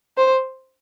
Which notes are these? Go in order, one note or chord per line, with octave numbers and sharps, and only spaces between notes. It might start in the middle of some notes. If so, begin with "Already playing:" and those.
C5